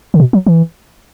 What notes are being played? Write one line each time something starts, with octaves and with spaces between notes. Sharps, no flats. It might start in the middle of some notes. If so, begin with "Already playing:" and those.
D3
B2
F#3
E3